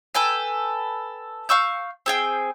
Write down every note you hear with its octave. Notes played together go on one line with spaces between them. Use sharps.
A4 B4 G5 G#5
F5 C#6 E6 G6
C4 G#4 G5